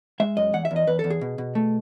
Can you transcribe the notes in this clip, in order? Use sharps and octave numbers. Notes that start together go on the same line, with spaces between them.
G#3 E5
F#2 D#5
E2 F#5
E5
E2
D#5
E2 B4
E2 A4
G#4
B2
B2
A3